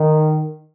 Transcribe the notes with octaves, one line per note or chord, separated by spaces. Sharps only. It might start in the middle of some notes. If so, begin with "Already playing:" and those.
Already playing: D#3